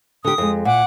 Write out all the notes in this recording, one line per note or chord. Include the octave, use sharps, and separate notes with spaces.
D3 G4 D#6
F2 G#3
A#2 F#5 D6